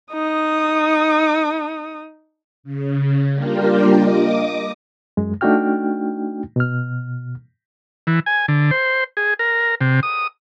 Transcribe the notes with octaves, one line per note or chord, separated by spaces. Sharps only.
D#4 D#6
C#3
G3 A#3 D4 F4 G4 A#4
D#5 D6 D#6
F#2 G#3
A3 D4 D#4 F#4 G5 F6
B2 F6
E3
G#5
D3
C5
G#4
A#4
C3
D#6